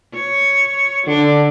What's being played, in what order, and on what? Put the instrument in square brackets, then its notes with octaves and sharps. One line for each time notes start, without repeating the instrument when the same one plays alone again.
[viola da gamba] C#5
[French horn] D3 [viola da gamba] D4